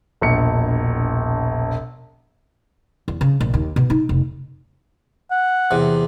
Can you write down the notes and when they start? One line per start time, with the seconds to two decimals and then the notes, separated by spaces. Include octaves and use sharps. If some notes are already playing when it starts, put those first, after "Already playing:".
0.21 E1 A#1 C#7
3.08 E2
3.21 C#3
3.41 A#1
3.54 D#2
3.76 B2
3.90 D#4
4.09 F1
5.31 F#5
5.71 E2 C3